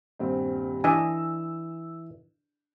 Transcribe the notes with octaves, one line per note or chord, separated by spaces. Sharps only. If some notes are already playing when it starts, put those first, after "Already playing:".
D#1 G2 C4
E3 D4 D#5 G#5 E6